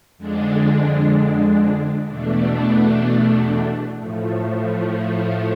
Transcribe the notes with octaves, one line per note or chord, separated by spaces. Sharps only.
F2 D3 G#3 D4
E2 B2 A3 D4
A2 F3 A3